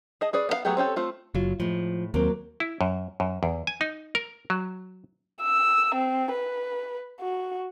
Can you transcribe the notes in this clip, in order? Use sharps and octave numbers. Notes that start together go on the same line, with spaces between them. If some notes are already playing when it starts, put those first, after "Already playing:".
G#4 D#5 A5
C#4 G#4 B4 D5
B3 D4 F5
F#3 A3 B3 G4 G#4
C4 C#4 G4 A4
A3 C4 F4
F#1 F#3 F4
A2 F3 G#3
D#2 F#3 A#3 C4
E4
F#2
F#2
E2
G#5
D#4
A#4
F#3
E6
C4
B4
F#4